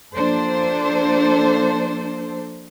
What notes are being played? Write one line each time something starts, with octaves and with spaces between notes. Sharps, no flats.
F3 A#3 D4 A4 C5